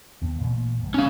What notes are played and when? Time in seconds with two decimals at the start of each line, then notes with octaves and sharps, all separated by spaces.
0.21 D#2 B3
0.40 A1 A#2 A#3
0.81 F1 G#3
0.94 C#4 F5